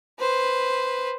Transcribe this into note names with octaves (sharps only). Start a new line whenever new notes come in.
B4 C5